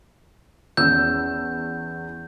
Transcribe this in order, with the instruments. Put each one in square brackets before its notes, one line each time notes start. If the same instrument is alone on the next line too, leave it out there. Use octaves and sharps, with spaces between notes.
[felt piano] E2 C#4 E6 [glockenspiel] G6